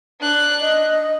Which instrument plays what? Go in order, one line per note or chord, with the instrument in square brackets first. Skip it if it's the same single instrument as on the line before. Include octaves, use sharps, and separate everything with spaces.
[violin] D4 F#6
[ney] D#5